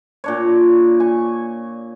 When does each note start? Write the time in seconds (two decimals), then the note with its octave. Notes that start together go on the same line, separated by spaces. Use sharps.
0.24 A#2 D4 C#5
1.00 G#5 C#6